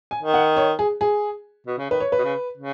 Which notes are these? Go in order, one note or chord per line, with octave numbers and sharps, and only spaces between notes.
G#5
D#3
F#5
C#5
G#4
G#4
B2
C#3
D#3 B4
C#5
B4
B2
C#3
C#3